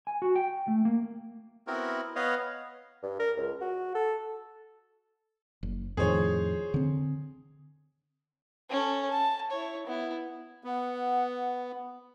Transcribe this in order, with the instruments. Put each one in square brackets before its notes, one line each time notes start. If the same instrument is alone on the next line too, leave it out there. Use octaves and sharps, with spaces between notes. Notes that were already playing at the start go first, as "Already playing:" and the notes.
[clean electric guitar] G#5
F#4
G5
A3
A#3
[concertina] B3 C4 E4 F#4 A#4
B3 B4 C#5 D#5 F5
[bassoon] G2
A#4
C#2
F#4
A4
[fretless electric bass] F#1
[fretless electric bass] F2 A2 D#3 [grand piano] G#4 C5 C#5
[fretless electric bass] D3 C4
[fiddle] C#4 A4
A5
E4 C#5
B3 E4
[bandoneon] B3 [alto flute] F#5